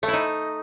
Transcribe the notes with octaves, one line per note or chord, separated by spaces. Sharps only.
A3
E4
D#4